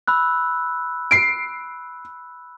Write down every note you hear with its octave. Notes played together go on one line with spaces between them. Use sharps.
B5 E6 F#6
C7 D7